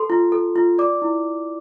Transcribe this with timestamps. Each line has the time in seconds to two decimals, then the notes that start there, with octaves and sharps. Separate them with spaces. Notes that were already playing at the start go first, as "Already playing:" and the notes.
Already playing: A4 C6
0.10 F4
0.32 A4
0.56 F4
0.79 D5 D6
1.02 E4